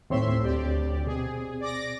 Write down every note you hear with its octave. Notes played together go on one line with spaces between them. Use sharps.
D#2 A2 C4 C#5 E5 C6
D2 G4 D5
B2 C4 G#4
D5 D6 A#6